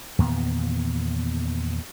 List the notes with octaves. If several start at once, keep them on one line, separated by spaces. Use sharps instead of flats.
E2 A#2 D#3 B3